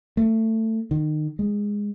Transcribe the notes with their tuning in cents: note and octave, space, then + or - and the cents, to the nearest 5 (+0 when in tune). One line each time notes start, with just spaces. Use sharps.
A3 +20
D#3 -30
G#3 -15